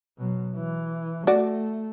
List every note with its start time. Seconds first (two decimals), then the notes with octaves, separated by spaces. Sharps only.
0.18 B2 F#3
0.57 E3
1.27 A3 F#4 D5